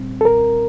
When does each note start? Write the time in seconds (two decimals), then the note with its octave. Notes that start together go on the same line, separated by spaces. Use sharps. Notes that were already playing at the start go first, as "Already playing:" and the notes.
Already playing: A#2 G3 C4
0.21 A4
0.25 A#4